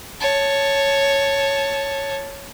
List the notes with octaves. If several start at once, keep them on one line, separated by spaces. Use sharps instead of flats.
C#5 A5